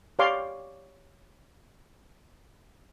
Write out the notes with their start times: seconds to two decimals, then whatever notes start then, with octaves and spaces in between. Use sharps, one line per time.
0.19 G4 C#5 D5 F5 C6 D6